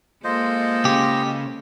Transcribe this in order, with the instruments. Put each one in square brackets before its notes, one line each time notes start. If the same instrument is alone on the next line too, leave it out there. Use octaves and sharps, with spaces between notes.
[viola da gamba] G#3 A#3 A4 [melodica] F4 C5 D#5
[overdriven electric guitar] C#3 [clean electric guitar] G4